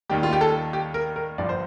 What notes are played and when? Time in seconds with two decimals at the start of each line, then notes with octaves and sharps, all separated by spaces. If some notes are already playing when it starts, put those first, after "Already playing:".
0.09 D#2 D#3 G3 G4
0.23 F4
0.33 G4
0.41 A4
0.73 G4
0.94 A#4
1.16 A#4
1.38 G1 G2 F3 D5
1.49 C5